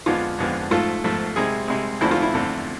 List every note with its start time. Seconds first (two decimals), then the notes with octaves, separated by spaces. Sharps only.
0.06 F2 D3 F3 G#3 B3 F4
0.39 F2 D3 F3 G#3 B3
0.71 G#2 F3 A3 F4
1.04 G#2 F3 A3
1.36 C2 C3 G#3 G#4
1.68 C2 C3 G#3
2.01 E2 D3 F3 A3 C4 E4
2.11 F4
2.22 E4
2.33 E2 D3 F3 A3 C4